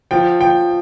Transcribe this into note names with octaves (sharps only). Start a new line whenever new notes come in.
F3 G5
F3 G5